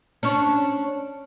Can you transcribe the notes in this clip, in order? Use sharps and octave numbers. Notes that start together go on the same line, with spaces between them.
C#4 D4 C#5